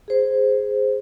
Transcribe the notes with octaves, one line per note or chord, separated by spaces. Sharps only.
G#4 C5